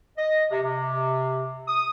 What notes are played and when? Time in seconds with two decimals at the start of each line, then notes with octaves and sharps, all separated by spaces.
0.17 D#5
0.51 C3
0.63 C3
1.67 D#6